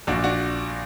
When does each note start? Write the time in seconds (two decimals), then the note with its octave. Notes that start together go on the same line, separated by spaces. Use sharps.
0.07 A#1 D4 F#4
0.24 D4 F#4